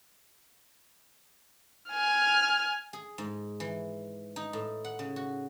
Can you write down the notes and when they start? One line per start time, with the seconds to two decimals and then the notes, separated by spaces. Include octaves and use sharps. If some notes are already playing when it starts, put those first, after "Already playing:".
1.90 G#5 F6
2.93 G#4
3.18 G#2
3.60 E3
4.36 D#4
4.53 A2
4.85 F#5
4.99 C#3
5.16 F#4